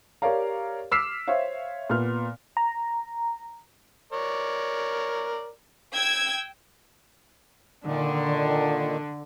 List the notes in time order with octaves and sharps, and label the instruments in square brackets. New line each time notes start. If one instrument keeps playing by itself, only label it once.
[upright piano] G4 A#4 C#5 D5 F5 A#5
D6 E6 F6 B6 C7 E7
C5 C#5 E5 F5
A#2 B3 F6
[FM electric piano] A#5
[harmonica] A#4 C#5 D5
[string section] G5 E6 G#6
[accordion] A#2 D#3 [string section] D3